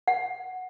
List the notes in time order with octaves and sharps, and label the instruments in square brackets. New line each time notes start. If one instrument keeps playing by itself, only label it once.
[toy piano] F#5